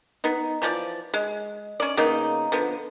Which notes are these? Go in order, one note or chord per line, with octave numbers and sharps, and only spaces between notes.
B3 D#4
E3 F3 F#4 D5
G#3
C#4 D5
C#3 A#3 B3 D#4
D3 F3 B3